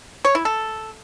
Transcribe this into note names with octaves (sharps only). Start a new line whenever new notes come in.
C#5
E4
A4